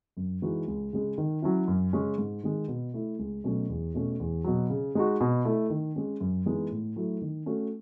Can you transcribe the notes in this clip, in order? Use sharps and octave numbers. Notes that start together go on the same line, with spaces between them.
F#2
E3 G#3 D#4 F#4
C#2
C#3 G#3
D#3
F#3 C#4 E4
F#2
C#3 G#3 C#4
G#2
D#3 G#3
B2
A3 E4
C#2
B2 F#3 A3 C#4
E2
B2 A3 C#4
E2
B2 F#3
C#3
G#3 D#4 F#4
B2
A3 E4
D#3
G#3 C#4
F#2
E3 G#3 B3 D#4
A2
F#3 A3 E4
D#3
A3 C#4 F#4